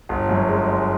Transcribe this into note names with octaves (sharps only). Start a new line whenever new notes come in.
G1
F#2
G#3
G#3